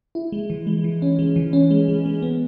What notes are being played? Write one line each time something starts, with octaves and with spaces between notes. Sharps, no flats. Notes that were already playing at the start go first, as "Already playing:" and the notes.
E4
G#3
E3
G#3
E3
C#4
G#3
E3
C#4
G#3
G#3
G#3
B3